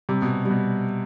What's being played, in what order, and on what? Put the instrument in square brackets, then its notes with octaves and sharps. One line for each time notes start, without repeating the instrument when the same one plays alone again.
[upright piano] C3 [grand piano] G3
[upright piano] B2
[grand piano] G3
[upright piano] B2